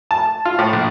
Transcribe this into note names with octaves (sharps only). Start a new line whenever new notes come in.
A5
F4
A2
A#1